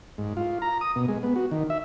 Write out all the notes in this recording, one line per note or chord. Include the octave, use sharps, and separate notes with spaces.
G#2
F4
A#5
D#6
B2
G#3
B3
F#4
D#3
E5